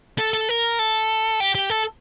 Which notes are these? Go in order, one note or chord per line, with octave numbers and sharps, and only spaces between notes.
A4
A4
A#4
A4
G4
G4
A4